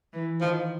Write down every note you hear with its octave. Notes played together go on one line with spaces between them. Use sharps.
E3
D#3 F3